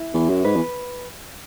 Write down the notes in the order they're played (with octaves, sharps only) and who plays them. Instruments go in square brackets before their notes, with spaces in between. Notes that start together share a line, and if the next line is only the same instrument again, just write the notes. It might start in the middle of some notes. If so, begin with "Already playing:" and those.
Already playing: [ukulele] E4
[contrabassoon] E2
F#2
[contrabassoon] G#2 [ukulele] B4
[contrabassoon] E2